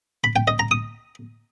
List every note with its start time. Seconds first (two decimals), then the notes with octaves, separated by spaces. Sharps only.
0.24 B5
0.36 G5
0.48 D#5
0.59 A#5
0.71 D#6